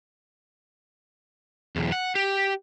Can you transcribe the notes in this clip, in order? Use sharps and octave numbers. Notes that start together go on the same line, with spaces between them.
B1 E2
F#5
G4